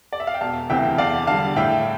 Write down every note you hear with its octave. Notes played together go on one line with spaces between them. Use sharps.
D5
E5
F5
G5
E1 F5 A5
D2 C3 E3 E5 G5
E2 D5 F5
D3 G3 F5 A5
A2 E5 G5